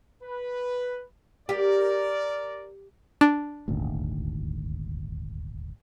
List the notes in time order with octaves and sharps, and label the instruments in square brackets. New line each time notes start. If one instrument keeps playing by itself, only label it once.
[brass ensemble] B4
[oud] G4 [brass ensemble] A#4 D5
[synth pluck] D4
[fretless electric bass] D#1 G#1 D2